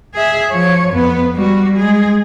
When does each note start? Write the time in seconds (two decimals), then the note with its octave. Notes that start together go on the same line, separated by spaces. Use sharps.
0.14 G#4 E5
0.51 F3 C#5
0.93 F2 B3
1.34 G3 F#4
1.76 G#3 G#4